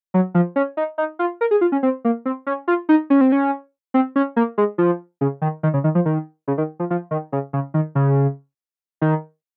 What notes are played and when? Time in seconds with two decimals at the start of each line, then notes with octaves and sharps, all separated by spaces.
0.14 F#3
0.34 F3
0.56 C#4
0.77 D#4
0.98 D#4
1.19 F4
1.41 A#4
1.51 G#4
1.61 F4
1.72 C#4
1.83 C4
2.05 A#3
2.25 C4
2.46 C#4
2.68 F4
2.89 D#4
3.10 C#4
3.21 C4
3.32 C#4
3.94 C4
4.16 C#4
4.36 A#3
4.58 G#3
4.78 F3
5.21 C#3
5.42 D#3
5.63 D#3
5.74 C#3
5.84 D#3
5.95 F3
6.06 D#3
6.48 C#3
6.58 D#3
6.80 F3
6.90 F3
7.11 D#3
7.32 C#3
7.53 C#3
7.74 D#3
7.95 C#3
9.01 D#3